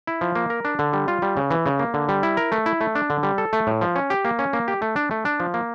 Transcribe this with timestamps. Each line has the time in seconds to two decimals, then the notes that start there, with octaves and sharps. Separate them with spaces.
0.07 E4
0.21 F3
0.35 A#3
0.50 A#4
0.65 D4
0.79 D3
0.93 G3
1.08 F4
1.22 G3
1.37 C#3
1.51 E3
1.66 C#3
1.79 A#3
1.94 D3
2.09 G3
2.23 E4
2.37 A#4
2.52 A3
2.66 E4
2.81 A3
2.95 D4
3.10 D3
3.23 G3
3.38 A4
3.53 A3
3.67 A2
3.81 F3
3.96 C#4
4.10 G4
4.25 A#3
4.39 C#4
4.53 A#3
4.68 G4
4.82 A3
4.96 D4
5.11 A3
5.25 D4
5.40 F3
5.54 A#3